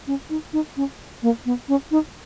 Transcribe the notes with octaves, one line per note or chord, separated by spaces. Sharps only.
C#4
D#4
D#4
C#4
A#3
B3
C#4
D#4